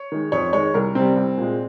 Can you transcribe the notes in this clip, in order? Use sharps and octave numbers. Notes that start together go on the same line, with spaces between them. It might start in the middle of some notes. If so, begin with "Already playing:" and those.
Already playing: C#5
D#3 G#3
F2 C#5
D#3 G#3 C#5
C2 A#4
C3 G3 C4
C2
A#2 G#3